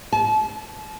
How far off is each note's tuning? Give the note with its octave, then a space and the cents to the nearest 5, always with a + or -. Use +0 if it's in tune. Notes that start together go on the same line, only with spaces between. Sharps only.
A5 -35